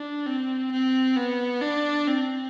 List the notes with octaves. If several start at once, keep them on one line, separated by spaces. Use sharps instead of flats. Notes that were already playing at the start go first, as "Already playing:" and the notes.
Already playing: D4
C4
C4
B3
D4
C4